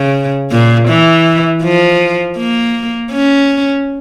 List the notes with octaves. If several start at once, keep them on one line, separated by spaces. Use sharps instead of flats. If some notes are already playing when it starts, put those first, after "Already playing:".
Already playing: C#3
A#2
E3
F3
A#3
C#4